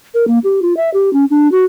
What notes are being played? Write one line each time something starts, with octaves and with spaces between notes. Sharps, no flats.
A#4
A#3
G4
F4
E5
G4
C#4
D4
F#4